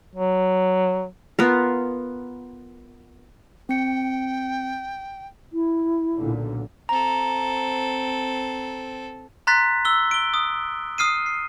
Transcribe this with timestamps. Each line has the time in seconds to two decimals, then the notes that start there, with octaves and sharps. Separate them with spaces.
0.16 F#3
1.39 B3 F4 A#4
3.69 C4 G5 C#7
5.53 E4
6.16 B1 A#2 D3
6.89 C4 A4 A#5
9.47 A#5 C6 F#6 A6 B6
9.85 E6 G7
10.11 D7 G7
10.34 D#6
10.98 D#6 F6 C7 D#7
11.26 C7